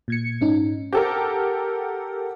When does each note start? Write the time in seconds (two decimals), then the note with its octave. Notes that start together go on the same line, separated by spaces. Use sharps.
0.08 A#2 G#6 C#7
0.41 G#2 C#4 D#4
0.93 G4 A4 A#4 F#5